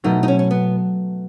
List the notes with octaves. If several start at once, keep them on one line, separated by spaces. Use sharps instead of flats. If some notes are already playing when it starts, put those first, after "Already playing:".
B2 F#3 A3 D#4
D#4
C#4
C#4
B3